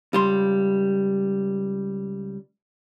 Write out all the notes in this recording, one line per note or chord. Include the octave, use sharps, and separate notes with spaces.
C#2 G3 C6